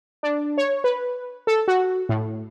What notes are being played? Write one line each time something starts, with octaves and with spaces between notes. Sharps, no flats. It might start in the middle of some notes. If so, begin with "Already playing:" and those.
D4
C#5
B4
A4
F#4
A2